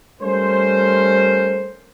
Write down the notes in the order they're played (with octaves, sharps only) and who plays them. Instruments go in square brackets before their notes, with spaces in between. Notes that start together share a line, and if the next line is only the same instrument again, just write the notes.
[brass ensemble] G3 A3 C#4 A#4 C5